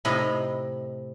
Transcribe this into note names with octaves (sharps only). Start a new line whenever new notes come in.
A2 C3 D#5 A#5 B5